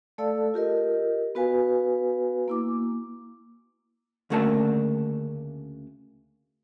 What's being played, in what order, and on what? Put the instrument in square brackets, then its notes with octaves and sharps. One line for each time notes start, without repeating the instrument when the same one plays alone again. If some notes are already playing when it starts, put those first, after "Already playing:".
[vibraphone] A3 A4 D5 F5 A5 E6
F4 G4 A#4 D#5
B3 F#4 B4 F5 G#5
A#3 E4 D6
[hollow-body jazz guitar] D2 C#3 A3 A#3 D4 A5